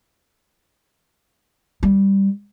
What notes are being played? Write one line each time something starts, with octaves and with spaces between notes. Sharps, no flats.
G3